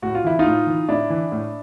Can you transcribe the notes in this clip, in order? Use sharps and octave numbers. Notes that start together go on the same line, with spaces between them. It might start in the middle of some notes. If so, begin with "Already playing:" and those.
A2 F#4
F4
E3 E4
D#4 F4
A2
E3
A2 D4 E4
E3
A2